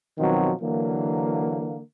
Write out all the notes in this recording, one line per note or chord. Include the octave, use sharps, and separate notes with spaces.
B2 D#3 F3 F#3 C4
D3 E3 F#3 A#3